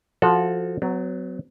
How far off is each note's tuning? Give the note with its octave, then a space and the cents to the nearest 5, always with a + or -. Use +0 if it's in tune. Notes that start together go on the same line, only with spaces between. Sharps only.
F3 +0 F#4 -20 A4 +0
F#3 +0 B3 +45